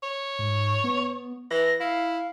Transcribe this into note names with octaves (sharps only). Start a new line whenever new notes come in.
C#5
G#2
B3
E3 A#6
E4 F5